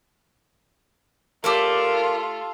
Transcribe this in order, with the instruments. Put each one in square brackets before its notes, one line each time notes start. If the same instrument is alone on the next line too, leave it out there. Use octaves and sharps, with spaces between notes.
[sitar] A3 [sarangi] F4 [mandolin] G4 A4 D5 [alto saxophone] A#4